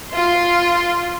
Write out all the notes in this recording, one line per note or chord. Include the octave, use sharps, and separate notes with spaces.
F4 C6